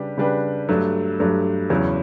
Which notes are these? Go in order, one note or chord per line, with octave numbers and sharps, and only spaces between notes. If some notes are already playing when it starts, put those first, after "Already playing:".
Already playing: C#3 G3 D4 G4 B4
C#3 G3 D4 G4 B4
G2 F#3 A3
G2 F#3 A3
E2 C#3 F#3 C#4 E4